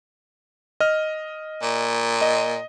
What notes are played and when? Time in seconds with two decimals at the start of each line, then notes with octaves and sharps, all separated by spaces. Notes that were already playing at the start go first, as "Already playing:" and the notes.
0.80 D#5 F6
1.62 A#2
2.22 D#5